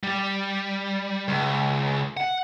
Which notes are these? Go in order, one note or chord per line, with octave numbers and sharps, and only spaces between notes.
G3
C#2
F#5